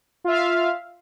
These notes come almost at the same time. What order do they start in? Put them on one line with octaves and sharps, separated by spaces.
F4 E5 F5